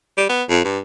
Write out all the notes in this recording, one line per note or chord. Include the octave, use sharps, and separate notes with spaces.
G3
B3
F2
G2